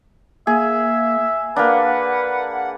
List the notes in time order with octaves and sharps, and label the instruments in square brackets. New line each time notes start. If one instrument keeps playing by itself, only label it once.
[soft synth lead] A#3 [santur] G#4 [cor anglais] E5
[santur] A#3 D4 [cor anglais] B4 [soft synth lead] F#5